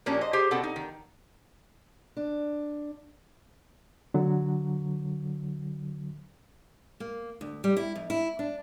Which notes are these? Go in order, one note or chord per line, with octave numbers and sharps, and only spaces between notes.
A#2 F3 A#3 C#4 D4 G4
C5 D#5
G4 G#4 C5
B2 C4 A4 F#5
D#4
D#3
D4
D3 F#3
A#3
D2
G3
E4
F2
E4
D4